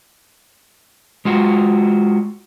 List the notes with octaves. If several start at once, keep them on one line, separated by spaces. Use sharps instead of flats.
G#3 F4 F#4